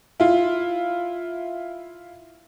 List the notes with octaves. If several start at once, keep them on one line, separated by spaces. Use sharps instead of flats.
E4 F4